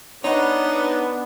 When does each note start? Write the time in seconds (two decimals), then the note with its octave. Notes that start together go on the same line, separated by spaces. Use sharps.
0.24 B3 D4 D#4 C#5 D#5